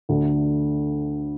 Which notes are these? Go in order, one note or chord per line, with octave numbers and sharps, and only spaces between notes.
D2 D3 A3 D4